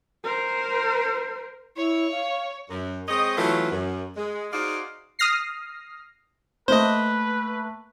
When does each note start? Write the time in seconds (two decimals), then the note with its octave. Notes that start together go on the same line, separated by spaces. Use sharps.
0.24 A#4 C5
1.77 E4 C#5
2.12 F5
2.70 F#2
3.08 G#3 C4 C#5 D#5
3.37 E3 F#3 A3 B3 C#4 F4
3.71 F#2
4.16 G#3
4.53 D#4 F#4 G#4 C5 D5 F5
5.19 D#6 F6 A#6 C7
6.68 A3 A#3 B4 C5 D#5